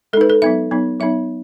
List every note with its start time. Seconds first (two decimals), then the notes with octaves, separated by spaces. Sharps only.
0.13 G#3 A4
0.17 D#4 B4
0.30 A4
0.42 F#3 B3 D#4 E5
0.71 F#3 B3 D#4
1.00 F#3 B3 D#4 E5